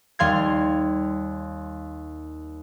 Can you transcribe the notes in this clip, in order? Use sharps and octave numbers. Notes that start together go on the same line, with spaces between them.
D#2 G3 F5 C6 G#6